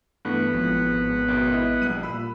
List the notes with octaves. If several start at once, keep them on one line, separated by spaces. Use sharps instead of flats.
G2 E3 A3 B3 F#5
G#1 A2 F3
B1 F#2
E4 D#5 E5
A#1 G3 F#6 D#7
A#2 B5 E6